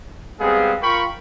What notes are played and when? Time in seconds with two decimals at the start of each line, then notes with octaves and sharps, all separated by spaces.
0.39 G3 G#3 B3 C4 G#4 F5
0.81 F4 A#4 G5 B5 C#6